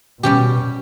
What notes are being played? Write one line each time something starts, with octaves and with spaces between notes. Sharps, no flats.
B2 G3 C#4 G4